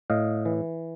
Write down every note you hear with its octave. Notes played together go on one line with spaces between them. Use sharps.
A2 D#5 F5
E3